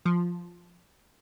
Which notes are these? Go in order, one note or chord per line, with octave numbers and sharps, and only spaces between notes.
F3